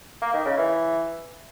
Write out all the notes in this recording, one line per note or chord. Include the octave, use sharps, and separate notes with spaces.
A#3
D#3
C#3
E3